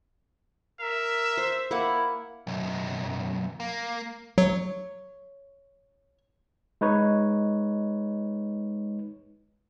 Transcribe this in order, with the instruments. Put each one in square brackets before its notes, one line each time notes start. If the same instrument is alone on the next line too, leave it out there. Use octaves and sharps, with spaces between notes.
[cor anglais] A#4 [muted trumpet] E5
[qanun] C5
[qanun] A#3 F#5 [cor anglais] E4
[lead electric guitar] B1 F#2
A#3
[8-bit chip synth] F#3 [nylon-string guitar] C#5
[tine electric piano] G#3 D#4 B4 C#5